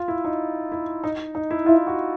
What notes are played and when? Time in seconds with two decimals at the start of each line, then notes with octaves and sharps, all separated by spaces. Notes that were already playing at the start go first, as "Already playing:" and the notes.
Already playing: F4
0.08 E4
0.25 D#4
0.72 E4
1.04 D#4
1.35 D#4
1.50 E4
1.66 E4 F4
1.87 F#4